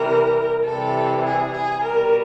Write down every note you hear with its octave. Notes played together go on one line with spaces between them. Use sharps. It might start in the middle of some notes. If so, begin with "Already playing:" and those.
Already playing: C3 E3 G3 A#4
C3 E3 G3 A4
G#4
G#4
B2 G3 A#4